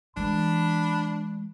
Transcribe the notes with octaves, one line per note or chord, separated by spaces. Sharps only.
E3 G#3 D4 B5